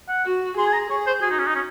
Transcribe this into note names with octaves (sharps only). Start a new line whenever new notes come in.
F#5
F#4
G#4 C6
G#5
A#5
G#4 C#5
C5
F#4 G#4
D#4
C#4
D#4
C#4